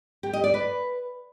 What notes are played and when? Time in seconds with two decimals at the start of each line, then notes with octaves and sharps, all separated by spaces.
0.23 G4
0.33 D#5
0.44 D5
0.54 B4